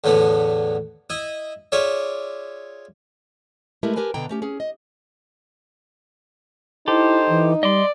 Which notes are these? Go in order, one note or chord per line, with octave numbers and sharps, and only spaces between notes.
E2 A2 D3 B3
E4 D#5
F4 G#4 C#5 D5 E5
G#3 A3 E4 G4 A#4 B4
G4 A#4 B4 G#5 A5
B2 D3 B3 D4 G5 A#5
A3 C#4 G4
C#4 G#4
D#5
D#4 E4 G4 A4 C5
E3
G3 D5 D#5 C6